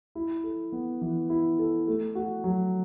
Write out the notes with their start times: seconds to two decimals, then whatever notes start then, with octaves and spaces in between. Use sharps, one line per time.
0.15 E4
0.43 A4
0.72 B3
1.01 E3
1.30 E4
1.59 A4
1.87 A3
2.15 F#4
2.44 F#3